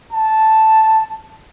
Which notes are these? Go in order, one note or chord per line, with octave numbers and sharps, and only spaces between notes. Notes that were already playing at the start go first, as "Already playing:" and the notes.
A5